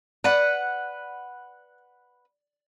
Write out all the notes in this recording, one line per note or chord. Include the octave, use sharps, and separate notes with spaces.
B4 D5 F#5